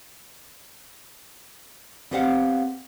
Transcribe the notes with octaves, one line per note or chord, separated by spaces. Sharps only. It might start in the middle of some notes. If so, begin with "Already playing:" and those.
B3 C4 G4 C5 F5 F#5